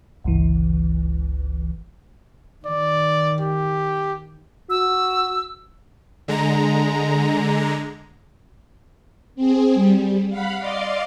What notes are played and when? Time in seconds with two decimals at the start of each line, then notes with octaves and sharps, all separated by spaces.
0.24 G1 C#2 E3
2.66 D#3 D5
3.40 G4
4.70 F#4 E6
6.28 D3 G#3 A#5
9.35 C4 G#4
9.74 G3
10.29 F5 F#5 B5
10.59 D5 D#5 F5 C6 D6